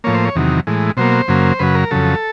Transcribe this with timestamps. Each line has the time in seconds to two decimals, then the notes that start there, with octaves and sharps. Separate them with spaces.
0.04 A2 F3 A#3 C#5
0.14 C5
0.25 C#5
0.35 E2 C3 D#3 F#3
0.67 A2 E3 G#3
0.97 B2 F#3 A#3 C5
1.28 F#2 C#3 F#3 A#3
1.59 F#2 C#3 F#3 B4
1.75 A#4
1.91 F2 C#3 F#3 A4